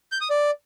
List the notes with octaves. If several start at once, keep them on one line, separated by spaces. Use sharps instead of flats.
G6
D#6
D5